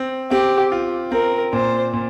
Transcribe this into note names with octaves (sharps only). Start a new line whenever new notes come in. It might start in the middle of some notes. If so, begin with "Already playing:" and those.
Already playing: C4
C4 G4
F4
C4 A#4
A#2 C5
A#2